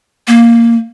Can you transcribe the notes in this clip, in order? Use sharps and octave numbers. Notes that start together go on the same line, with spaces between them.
A#3